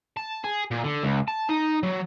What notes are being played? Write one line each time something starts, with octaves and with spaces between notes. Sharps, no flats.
A5
G#4
A#2
D3
C#2
A5
D#4
F#3